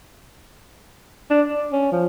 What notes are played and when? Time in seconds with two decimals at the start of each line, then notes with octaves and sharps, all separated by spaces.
1.31 D4
1.49 D5
1.72 C#4
1.92 F3